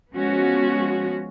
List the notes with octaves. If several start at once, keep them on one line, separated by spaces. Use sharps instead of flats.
F3 G#3 B3 C#4 F#4